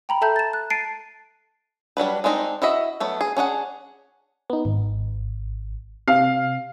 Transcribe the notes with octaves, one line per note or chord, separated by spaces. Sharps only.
G5 A#5 B5
A4 E5 A5 A#5 G6
A6 E7
F#6
A5 A6 C7 D7 D#7
F#3 G3 D4 B4
G#3 C4 D4 D#4
E4 F#4 D#5 E5
F#3 A3 B3
G#4
C#4 D4 G#4 F#5
B3 D#4
G#1
C3 F5